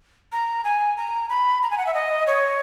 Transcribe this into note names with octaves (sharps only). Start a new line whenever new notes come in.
A#5
G#5
A#5
B5
A#5
G#5
F#5
E5
D#5
C#5